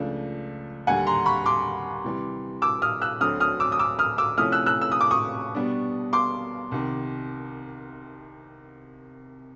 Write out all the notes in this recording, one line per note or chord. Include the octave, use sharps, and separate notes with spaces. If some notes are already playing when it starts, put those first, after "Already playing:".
Already playing: C#2 C#3 F3 A3 D4
D#2 D3 G3 F#5 G#5
A#5 C6
B5 C#6
C6 D6
C3 E3 G3
D6 E6
D#6 F6
E6 F#6
D2 D3 F#3 A3 C4 D#6 F6
D#6 F6
D6 E6
D#6
D6 E6
D#6 F6
D6 E6
C3 F3 A3 C#4 E4 D#6 F6
E6 F#6
E6 F#6
E6
D#6
D6
C#6 D#6
B2 G3 B3 D4
C6 D6
C2 C3 D#3